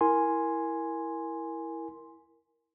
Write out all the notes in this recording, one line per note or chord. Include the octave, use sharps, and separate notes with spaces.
E4 A#4 G#5 C6